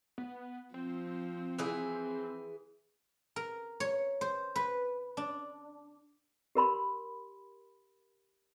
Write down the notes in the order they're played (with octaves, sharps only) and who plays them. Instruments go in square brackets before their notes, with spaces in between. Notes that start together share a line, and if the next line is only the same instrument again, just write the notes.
[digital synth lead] B3
[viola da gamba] F3 [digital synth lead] C4
[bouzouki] E3 G#4
[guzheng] A#4
C#5
C5
B4
D4
[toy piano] G4 A#4 B5 C6